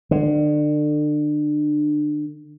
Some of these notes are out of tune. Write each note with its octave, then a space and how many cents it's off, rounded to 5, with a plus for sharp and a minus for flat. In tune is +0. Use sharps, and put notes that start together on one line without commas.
D3 +30